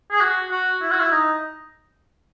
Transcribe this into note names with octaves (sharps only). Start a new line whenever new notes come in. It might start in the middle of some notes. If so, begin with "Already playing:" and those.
G#4
F#4
F#4
E4
F#4
E4
D#4